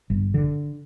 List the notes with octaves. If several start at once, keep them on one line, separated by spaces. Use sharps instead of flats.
G1
D3